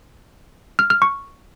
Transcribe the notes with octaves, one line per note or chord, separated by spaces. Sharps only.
F6
F6
C#6